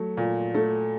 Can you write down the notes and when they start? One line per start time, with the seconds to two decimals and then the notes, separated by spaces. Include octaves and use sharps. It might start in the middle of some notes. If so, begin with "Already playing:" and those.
Already playing: F#3 A3
0.17 A#2
0.55 A3